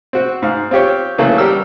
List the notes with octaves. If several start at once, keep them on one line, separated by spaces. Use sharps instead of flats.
C4 F#4
G#2 F5
C4 F4 G4 C#5
C#3 E3 F#3 A3 A#3
G3 G4 A#4 E6